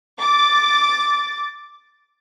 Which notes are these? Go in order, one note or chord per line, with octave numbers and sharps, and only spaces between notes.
D6 A6